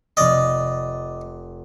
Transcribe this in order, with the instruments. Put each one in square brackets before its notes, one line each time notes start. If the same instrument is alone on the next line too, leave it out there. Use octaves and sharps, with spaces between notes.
[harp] F1 D#6 F6 [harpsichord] D5 D#5